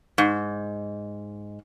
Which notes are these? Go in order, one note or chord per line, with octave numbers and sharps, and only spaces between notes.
G#2